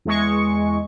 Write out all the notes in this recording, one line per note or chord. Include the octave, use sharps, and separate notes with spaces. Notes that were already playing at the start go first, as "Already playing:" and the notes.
E2 G#3 C#6